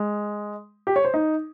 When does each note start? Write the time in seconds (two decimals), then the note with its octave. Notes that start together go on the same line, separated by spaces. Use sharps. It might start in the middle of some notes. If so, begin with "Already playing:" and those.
Already playing: G#3
0.87 G4
0.96 C#5
1.05 C5
1.14 D#4